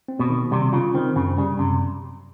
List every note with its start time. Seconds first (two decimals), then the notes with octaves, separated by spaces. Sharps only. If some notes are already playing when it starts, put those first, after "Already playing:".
0.08 C4
0.19 B2
0.30 D#3
0.51 C3 G3
0.73 C#3 F4
0.94 D#3 C4
1.16 F#2 C#3
1.37 C#3 G3
1.59 F#2 C3